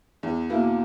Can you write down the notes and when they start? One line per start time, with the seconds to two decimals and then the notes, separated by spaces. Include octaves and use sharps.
0.23 E2
0.50 B2 A#3 E4